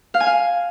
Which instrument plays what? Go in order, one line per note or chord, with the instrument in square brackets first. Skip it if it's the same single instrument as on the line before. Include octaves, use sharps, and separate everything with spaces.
[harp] F5
G#5
F5